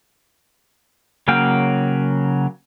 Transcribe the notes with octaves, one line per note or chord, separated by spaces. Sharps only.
C#3 F#3 A#3 F5 G5